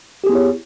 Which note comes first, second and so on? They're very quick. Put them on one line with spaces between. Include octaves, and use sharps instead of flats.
G4 G#4 B3 E4 C#5